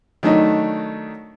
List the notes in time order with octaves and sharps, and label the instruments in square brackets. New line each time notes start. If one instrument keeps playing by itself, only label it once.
[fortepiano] D#3 F#3 A3 D4 D#4 D#5